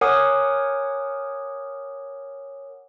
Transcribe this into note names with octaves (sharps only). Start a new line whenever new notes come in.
A#4 C#5 F#5 G#5 D6 D#6